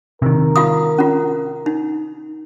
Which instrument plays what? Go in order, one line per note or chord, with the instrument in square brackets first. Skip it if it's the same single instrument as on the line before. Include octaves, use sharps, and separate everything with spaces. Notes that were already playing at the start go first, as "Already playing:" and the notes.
[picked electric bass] C3 D#3 [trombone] A#4
[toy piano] F4 F5 D#6
C#4 F4
D#4